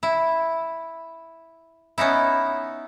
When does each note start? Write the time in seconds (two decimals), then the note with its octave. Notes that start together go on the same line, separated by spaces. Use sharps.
0.03 E4
1.98 B3 C#4 D#4 E4